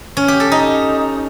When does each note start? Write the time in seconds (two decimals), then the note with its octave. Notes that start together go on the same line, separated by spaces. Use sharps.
0.17 C#4
0.28 G4
0.40 A4
0.52 D#4